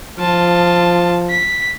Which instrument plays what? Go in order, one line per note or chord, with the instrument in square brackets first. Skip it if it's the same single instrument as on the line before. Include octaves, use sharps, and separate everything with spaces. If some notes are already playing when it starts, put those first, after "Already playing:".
[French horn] F3 [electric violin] F4 A5
[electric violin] B6